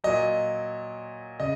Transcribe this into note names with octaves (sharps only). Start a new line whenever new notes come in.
A#2 F#3 D#5
C#3 D#5